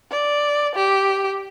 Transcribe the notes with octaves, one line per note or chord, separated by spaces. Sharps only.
D5
G4